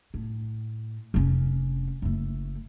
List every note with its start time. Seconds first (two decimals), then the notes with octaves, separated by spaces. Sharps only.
0.14 A2
1.14 F1 C#4
2.02 F#1 A3